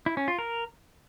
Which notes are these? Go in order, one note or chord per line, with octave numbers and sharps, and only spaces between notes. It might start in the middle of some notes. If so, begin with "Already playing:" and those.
E4
C#4
F4
A#4